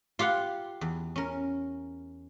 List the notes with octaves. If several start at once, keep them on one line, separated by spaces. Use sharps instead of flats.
F4 G4 F5 F#5
E2
C#4 A#4